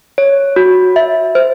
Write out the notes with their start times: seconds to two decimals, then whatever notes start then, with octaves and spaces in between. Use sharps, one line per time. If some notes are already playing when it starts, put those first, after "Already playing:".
0.18 C#5
0.56 F#4
0.96 E5
1.35 C5